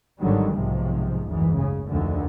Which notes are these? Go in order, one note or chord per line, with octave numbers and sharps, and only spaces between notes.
G#1 G#2 D3 D#3 F#3 G3
B1 G#2 C3 D#3 F3
F#1 D2 G#2 E3
C#3
F1 D2 D3 D#3